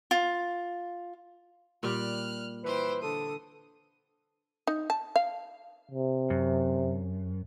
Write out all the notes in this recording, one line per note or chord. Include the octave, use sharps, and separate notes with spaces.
F4
A#2 G3 G4 F6 F#6
E3 B4 C5 G5
D3 A4 D#6
D#4
A5
F5
C3
F#2